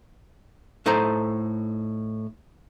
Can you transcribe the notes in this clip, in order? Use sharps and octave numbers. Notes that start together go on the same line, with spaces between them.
A2 D#4 A4 C5 A#5